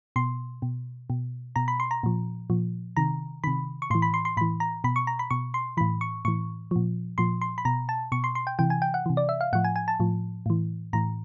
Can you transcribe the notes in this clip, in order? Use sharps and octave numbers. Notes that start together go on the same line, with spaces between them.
B2 C6
B2
B2
B2 A#5
B5
C6
A#5
A#2 F3
A#2 F3
C3 D#3 A#5
C3 D#3 B5
C#6
A2 E3 C6
B5
C6
C6
A2 E3 B5
A#5
B2 B5
C#6
A#5
B5
B2 C#6
C6
A2 E3 B5
C#6
A2 E3 C#6
A#2 F3
A#2 F3 C6
C6
B5
B2 A#5
A5
B2 C#6
C6
C6
G5
C3 E3 G5
G#5
G5
F#5
C3 E3
D5
E5
F5
A2 F3 F#5
G#5
G#5
A5
A2 F3
A2 E3
A2 E3 A#5